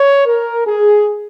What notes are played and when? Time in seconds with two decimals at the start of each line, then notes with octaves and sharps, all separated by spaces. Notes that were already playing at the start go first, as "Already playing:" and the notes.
Already playing: C#5
0.25 A#4
0.66 G#4